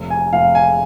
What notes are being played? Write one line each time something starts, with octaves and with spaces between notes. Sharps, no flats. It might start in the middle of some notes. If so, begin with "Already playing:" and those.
Already playing: F1
G#5
F1 F5
G#5